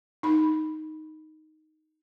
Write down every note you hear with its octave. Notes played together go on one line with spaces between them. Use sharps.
D#4 B5